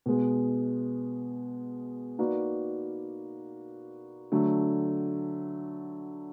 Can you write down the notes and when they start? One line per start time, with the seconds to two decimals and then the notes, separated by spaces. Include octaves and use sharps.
0.06 B2 G#3 B3
2.19 A#3 D#4 F#4 B4 D5
4.32 D3 F#3 A3